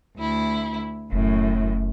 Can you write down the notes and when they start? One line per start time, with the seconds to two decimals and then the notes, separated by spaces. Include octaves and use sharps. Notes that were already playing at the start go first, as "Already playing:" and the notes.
0.18 D2 E4
1.12 F1 F#2 A2